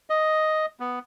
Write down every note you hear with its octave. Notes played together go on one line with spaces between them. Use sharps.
D#5
B3